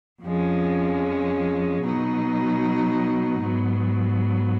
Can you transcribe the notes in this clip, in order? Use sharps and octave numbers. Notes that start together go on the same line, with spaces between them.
F2 F3 G#3 C#4
B2 F#3 B3 D#4
G#2 F#3 B3